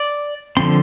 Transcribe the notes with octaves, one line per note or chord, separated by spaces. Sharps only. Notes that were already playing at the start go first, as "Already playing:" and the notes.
Already playing: D5
D3 F3 C4 C6